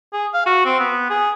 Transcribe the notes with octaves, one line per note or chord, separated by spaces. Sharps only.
G#4
F5
F#4
C4
B3
G#4